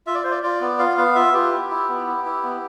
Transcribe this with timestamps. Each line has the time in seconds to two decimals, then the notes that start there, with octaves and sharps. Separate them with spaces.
0.07 F4 E5
0.15 D5
0.24 F4 C5
0.31 D5
0.43 F4 D5
0.61 B3
0.79 F4 F5
0.97 B3 F5
1.15 F4 E5
1.34 F4 G4
1.52 E4
1.70 E4
1.89 B3
2.07 E4
2.26 E4
2.43 B3